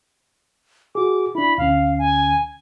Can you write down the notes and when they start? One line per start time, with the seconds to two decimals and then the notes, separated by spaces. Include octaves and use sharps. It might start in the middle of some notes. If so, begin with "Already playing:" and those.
0.95 F#4 G#4 D6
1.35 D4 E4 B5
1.58 D2 D3 C#4 F5
1.99 G#5